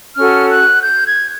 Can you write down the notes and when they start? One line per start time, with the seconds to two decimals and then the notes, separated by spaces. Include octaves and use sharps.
0.16 C#4 F#4 A4 F6
0.51 F#6
0.83 G6
1.06 G#6